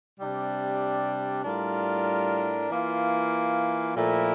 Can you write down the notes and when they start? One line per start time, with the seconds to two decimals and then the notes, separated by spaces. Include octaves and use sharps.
0.19 C3 G3 D4
1.44 A2 G3 D4 F4 A#4
2.69 E3 A#3 F4
3.96 A#2 F3 A3 E4 A#4